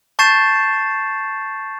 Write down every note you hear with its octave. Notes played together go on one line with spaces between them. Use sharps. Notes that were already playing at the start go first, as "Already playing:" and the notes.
A5 C#6 G6 A6 C7 E7